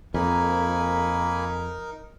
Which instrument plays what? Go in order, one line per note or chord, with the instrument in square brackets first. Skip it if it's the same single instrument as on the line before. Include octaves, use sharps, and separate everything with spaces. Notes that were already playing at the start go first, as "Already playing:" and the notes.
[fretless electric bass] F2 [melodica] A#3 G#5 B5 [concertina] D#4 A#4